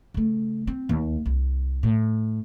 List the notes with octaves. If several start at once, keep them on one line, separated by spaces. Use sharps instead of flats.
C#3 A3
C4
D#2
C2
A2